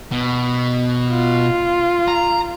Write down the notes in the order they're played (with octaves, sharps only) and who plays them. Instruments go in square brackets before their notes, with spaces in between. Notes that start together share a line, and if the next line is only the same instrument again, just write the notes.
[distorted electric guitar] B2
[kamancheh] F4
[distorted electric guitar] A#5